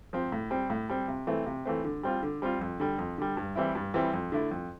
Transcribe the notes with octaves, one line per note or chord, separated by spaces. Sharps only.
F3 C4
A2
G3 C4
A2
G3 C4
C3
E3 A3 C4
C3
E3 A3 C4
D3
G3 C4 F4
D3
G3 C4 F4
F2
D3 G3
F2
D3 G3
G2
E3 G3 C4 E4
G2
E3 G3 C4 E4
F2
D3 A3 E4
F2